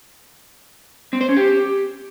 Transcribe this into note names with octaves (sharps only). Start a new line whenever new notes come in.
C4
C5
C#4
G4